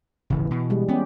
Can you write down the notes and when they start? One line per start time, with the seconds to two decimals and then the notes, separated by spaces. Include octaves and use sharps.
0.30 D1 G#1 C#3 E3
0.50 B2
0.70 G3 G#3
0.89 B3 C#4 G4